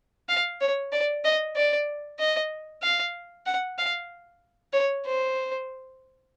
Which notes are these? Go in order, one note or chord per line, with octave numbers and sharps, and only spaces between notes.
F5
C#5
D5
D#5
D5
D#5
F5
F#5
F5
C#5
C5